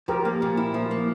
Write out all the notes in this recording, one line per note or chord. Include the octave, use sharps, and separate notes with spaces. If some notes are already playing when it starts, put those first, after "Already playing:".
F3 G4 A#4
A#3
A#2
E4
F3
A#3